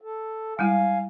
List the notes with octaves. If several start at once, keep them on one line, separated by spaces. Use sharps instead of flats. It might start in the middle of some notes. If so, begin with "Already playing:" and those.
A4
G3 G#3 E4 F5 G#5